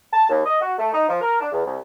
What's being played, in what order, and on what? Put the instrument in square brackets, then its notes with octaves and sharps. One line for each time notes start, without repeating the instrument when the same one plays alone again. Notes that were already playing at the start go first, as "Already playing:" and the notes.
[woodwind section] A5
D#2
D#5
F#4
A3
D#4
F3
A#4
D4
E2
C2